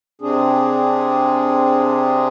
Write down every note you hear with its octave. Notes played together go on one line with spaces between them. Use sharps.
C3 C4 D4 G#4